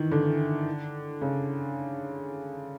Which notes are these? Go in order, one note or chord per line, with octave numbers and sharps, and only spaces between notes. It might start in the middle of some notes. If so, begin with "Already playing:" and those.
Already playing: D#3 E3
D3
C#3